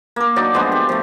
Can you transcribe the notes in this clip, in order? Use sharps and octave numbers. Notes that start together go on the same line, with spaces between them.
A#3 A#4
F#3 D4 D#4 D5
F3 G#3 B3 D4
G4
F3 A3